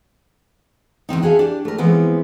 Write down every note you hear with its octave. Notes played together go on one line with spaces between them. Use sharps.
E2 D3 C4 D#4
F#4 G#4 A4 E5 F5
D4 G4
A3 A#4
E3 F3 G#3 B3 C4